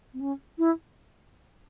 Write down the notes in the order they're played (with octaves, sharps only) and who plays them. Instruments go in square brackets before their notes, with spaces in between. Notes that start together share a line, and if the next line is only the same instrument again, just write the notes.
[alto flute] C4
C#4
E4